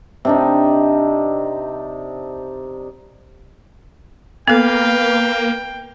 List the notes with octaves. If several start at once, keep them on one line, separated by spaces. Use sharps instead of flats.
C3 D4 D#4
A#3 B3 A4 B4 F5 G5